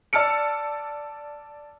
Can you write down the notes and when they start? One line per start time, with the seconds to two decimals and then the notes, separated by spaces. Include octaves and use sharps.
0.13 D5 A5 E6 F6 C#7